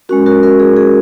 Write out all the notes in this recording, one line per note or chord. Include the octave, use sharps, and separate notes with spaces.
G#3 C#4 F#4 A#4
F#4 A#4
F#4 A#4
G#4
G#4